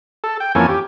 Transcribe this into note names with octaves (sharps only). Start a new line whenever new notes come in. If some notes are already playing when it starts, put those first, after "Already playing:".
A4
G5
F2 E3 A#3 C#4 A4 G#5
G4